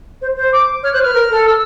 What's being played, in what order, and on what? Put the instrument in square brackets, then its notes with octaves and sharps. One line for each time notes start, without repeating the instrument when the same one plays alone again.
[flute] C5
C5
[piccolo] D6
[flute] C#5 [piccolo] F6
[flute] C5 [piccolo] F#6
[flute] B4 [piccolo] F6
[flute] A#4
A4
[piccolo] E6